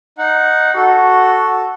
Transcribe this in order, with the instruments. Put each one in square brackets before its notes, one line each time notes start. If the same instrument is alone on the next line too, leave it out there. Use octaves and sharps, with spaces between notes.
[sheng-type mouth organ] D#4 F#5
[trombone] F#4 [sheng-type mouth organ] A4